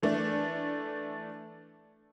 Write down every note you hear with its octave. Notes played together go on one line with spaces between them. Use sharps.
E3 A3 D4